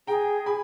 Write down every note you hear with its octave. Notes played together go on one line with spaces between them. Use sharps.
G#4 G5 A#5
G#5 B5